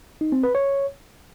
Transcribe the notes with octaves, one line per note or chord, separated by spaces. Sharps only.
D#4
C4
B4
C#5